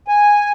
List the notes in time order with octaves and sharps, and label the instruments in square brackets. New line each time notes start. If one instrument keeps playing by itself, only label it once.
[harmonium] G#5